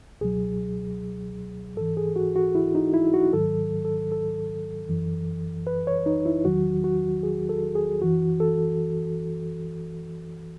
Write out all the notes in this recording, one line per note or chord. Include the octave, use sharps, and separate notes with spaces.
C#2 B2 F#3 G#4
G#2 E3 A4
G#4
F#4
F#4
E4
D#4
E4
F#4
G#2 D#3 F#3 A4
A4
A4
F#2 E3
B4
C#5
D#4
E4
E2 D#3 F#3 F#4
F#4
G#4
A4
G#4
F#2 E3 F#4
A4